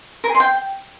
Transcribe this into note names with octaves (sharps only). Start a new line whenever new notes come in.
A#4
G#4
C6
G5